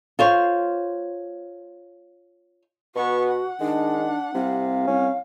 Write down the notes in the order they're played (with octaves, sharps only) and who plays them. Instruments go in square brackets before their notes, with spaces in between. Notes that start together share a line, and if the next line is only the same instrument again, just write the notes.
[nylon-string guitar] F4 C5 C#5
[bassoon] B2 [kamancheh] B3 C#6 [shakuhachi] F#4
[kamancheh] F#5
[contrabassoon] D#3 [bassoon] G#3 [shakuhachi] D4
[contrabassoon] C2 [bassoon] C3 [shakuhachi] F5
[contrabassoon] C2 [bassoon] C#4